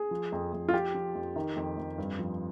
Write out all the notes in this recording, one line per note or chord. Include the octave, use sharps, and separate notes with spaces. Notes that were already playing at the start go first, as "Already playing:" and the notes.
Already playing: G#4
F3
F2
F2
F4
F2 G4
F3
F2
D#3
F2
F2
G2
F3